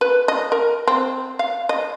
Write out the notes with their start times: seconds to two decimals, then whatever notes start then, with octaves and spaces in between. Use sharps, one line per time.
0.01 B4
0.28 D#5
0.52 A#4
0.87 C4
1.39 F5
1.69 D#5